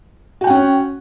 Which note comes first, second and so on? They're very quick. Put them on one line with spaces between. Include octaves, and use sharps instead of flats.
F#4 G5 F#5 C#4